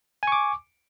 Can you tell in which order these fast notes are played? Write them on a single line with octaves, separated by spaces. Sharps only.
G#5 C#6 D6